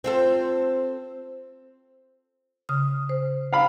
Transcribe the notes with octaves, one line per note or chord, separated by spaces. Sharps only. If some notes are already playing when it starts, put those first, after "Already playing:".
C4 F4 A4
C#3 D#6
C5
F5 B5